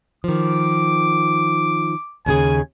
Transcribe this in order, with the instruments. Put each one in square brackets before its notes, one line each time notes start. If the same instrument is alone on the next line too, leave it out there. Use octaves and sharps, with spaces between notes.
[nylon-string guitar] D#3 F3 [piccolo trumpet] D6
[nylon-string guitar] D#2 C#3 G#4 [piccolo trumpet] G#5